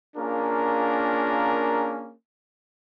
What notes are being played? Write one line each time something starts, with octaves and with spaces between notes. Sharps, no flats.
A#3 C#4 D4 F4 G#4 A#4